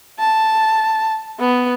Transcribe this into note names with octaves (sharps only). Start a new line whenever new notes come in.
A5
B3